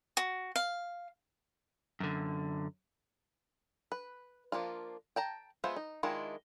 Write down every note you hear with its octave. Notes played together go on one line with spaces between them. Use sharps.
F#4
F5
F#2 D3
B4
F3 A#3 D4 F4
G5 A5 A#5
G#3 B3 F4 C5 E5
D#4
D#3 G#3 D4 E4 F4